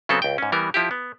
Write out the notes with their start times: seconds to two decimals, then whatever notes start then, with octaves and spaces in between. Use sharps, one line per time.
0.09 C#3 F#3 B3 C4 A4
0.22 C#2 G5
0.38 G#2 C#4
0.52 E3 G3 B3 A#4
0.74 F3 E4 G4
0.91 B3